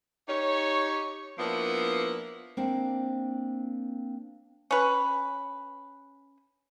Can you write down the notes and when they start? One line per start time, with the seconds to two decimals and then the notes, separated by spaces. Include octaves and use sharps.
0.29 D#4 G4 C#5
1.38 F3 A#3 B3 D4 E4
2.57 A#3 C4 D4 F#5
4.71 C#4 B4